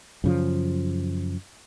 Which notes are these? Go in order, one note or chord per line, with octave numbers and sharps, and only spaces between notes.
F#2 C#3 F3